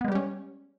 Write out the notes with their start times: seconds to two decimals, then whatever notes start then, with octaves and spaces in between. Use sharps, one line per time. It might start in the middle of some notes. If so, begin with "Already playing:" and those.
0.01 B3
0.04 G#3
0.08 G3
0.12 G4
0.15 C#4